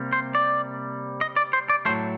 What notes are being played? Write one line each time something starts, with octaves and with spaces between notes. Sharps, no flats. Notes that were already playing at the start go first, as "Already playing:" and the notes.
Already playing: C3 G3 A#3
C5
D5
D#5
D5
C5
D5
A2 F#3 A3 C5